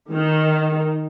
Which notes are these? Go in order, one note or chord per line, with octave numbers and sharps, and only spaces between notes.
D#3